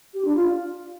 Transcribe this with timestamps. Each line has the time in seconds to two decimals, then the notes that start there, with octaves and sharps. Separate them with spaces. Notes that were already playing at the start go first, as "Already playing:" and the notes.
0.14 G4
0.25 D4
0.36 F4